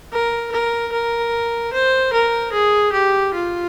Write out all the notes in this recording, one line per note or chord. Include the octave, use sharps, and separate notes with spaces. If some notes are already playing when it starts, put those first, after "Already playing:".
A#4
A#4
A#4
C5
A#4
G#4
G4
F4